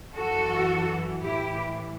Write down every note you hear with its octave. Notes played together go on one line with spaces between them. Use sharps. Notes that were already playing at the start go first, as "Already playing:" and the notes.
F#2 E3 F#4 A4
A2 E3 E4 G4